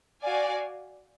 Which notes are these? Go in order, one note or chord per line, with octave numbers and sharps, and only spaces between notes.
F#4 D5 F5 G#5